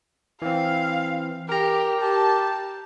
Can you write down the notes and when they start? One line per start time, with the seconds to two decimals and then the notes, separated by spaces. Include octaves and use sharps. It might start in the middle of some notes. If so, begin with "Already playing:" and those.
0.42 E3 C4 F5
1.49 G4 A#4 A#5
2.01 G4 A5